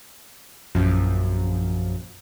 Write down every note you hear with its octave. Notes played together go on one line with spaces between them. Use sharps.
A#1 F#2 F3